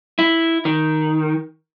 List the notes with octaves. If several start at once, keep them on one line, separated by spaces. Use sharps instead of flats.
E4
D#3